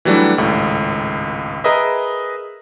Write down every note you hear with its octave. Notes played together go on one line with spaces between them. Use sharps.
E3 F#3 G3 A3 D4 E4
G#1 C#2 A2
G#4 A#4 B4 D#5 E5